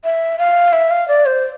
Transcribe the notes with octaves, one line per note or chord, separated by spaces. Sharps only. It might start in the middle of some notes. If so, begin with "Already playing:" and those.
E5
F5
E5
F5
D5
C5